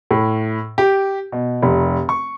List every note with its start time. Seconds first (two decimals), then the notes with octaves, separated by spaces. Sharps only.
0.11 A2
0.78 G4
1.32 B2
1.63 F1
2.09 C#6